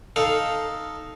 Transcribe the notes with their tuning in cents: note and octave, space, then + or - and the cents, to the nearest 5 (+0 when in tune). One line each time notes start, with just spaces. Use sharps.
D#4 +0 A4 +0 F5 +0